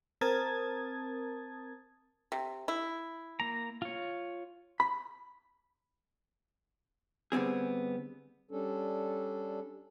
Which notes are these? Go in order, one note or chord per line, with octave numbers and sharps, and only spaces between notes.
C4 A#4 A5 D#6 G#6 A6
C3
E4
A#3 A#5
F4 C#5
B5
D3 G3 B3 C4 G#4
G3 C#4 D4 A4